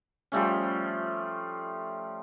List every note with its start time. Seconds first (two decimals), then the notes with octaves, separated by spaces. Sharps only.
0.32 F3 G3 A3 C#4